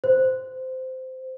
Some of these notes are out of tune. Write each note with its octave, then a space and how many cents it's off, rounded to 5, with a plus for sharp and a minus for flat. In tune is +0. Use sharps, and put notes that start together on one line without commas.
C5 -15